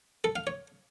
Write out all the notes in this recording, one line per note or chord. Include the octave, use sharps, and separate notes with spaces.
A4
F5
C#5